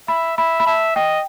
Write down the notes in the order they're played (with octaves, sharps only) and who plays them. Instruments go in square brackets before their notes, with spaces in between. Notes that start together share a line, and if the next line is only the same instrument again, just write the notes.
[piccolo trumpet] E5 [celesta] B5
[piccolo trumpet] E5 [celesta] B5
[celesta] B5
[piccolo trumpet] E5 [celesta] A5
[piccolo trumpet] D#5 [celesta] G5